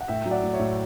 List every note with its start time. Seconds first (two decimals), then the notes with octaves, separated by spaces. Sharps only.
0.01 F#5
0.08 A2 E5 G5
0.26 F#3
0.31 D5 F#5
0.43 A2
0.53 C#5 E5
0.59 A2